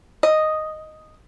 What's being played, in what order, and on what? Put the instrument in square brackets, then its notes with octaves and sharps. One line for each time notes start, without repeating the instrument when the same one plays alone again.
[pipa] D#5